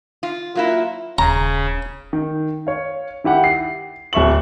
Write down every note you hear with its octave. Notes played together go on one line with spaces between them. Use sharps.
F4
F#3 A#3 E4 F4
D#1 C#3 A#5
D#3
C#5 F5
D#3 E4 G4 F#5
C7
D1 E5 C#6 F#7